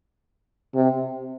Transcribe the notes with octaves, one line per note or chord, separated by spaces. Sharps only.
C3